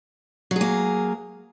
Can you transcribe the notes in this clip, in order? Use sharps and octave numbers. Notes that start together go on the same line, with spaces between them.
F#3 A#3 G#4